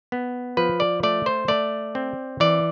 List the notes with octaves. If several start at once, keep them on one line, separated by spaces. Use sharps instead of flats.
B3
F3 B4
D5
A3 D5
C5
A3 D5
C4
E3 D5